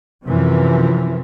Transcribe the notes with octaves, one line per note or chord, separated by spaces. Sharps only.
F#2 C3 E3 F3